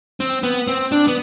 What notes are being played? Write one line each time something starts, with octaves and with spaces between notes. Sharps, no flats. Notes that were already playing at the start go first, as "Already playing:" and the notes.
C4
B3
C4
D4
B3